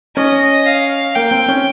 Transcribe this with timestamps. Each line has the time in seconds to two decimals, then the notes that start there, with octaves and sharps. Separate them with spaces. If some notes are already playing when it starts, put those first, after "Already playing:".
0.17 C#4 D#5
0.66 F5
1.15 A#3 G5
1.31 C4
1.48 C#4